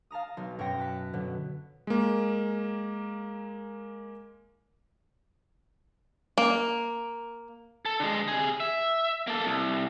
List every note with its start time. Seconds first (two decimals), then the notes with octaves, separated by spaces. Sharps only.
0.11 F5 A5 A#5 D#6
0.37 B1 C6
0.59 F#2 B2 C#5 G5 C6 A#6
0.78 A5 F#6 B6
1.13 B2 D3 F#3 B3
1.87 G#3 A#3
6.38 A#3
7.85 A4
8.00 D3 G#3
8.28 C3 G#4
8.60 E5
9.27 A#3 A4
9.45 C2